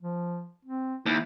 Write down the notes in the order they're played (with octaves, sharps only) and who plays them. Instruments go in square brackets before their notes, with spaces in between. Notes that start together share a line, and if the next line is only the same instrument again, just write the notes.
[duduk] F3
C4
[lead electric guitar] D#2 [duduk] E4